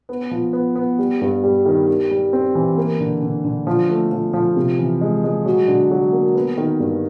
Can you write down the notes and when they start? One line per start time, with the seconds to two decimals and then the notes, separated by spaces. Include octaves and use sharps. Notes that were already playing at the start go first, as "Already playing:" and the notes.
0.09 B3
0.31 F3
0.53 B3
0.76 B3
0.99 G3
1.21 G2
1.43 G3
1.66 D#3
1.88 G3
2.11 G3
2.33 C4
2.55 E3
2.77 A#3
3.00 D3
3.22 D3
3.45 D3
3.67 F3
3.89 A3
4.12 F3
4.33 F3
4.56 C3
4.79 E3
5.01 G#3
5.24 G#3
5.46 F#3
5.68 D3
5.91 F#3
6.13 A#3
6.35 B3
6.57 D#3
6.80 G2